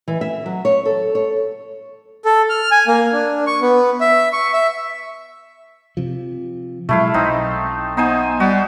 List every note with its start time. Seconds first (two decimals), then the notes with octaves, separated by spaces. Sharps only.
0.08 E3
0.21 E5
0.46 F#3
0.65 C#5
0.86 A4
1.15 C#5
2.25 A4
2.49 F6
2.71 G#5
2.88 A#3
3.12 D4
3.47 C#6
3.62 B3
4.01 E5
4.33 C#6
4.53 E5
5.97 C3 F3
6.89 B2 F#3 G#3 A3 E4 F5
7.14 B1 C4 D#4
7.97 B3 D#4 C5 G#5
8.40 G3 F#4